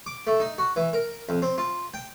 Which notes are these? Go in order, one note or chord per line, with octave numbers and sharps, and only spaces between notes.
D6
A3
D#4
F#4
E3
A#4
F2
C4
F4
G5